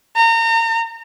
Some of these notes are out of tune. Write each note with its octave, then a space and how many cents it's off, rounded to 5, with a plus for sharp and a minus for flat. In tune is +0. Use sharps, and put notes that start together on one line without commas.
A#5 -30